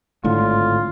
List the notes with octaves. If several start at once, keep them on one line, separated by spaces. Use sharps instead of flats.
G#1 A2 D3 F4